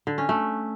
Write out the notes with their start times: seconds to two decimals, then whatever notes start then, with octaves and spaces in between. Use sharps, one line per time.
0.07 D3
0.18 C#4
0.29 A3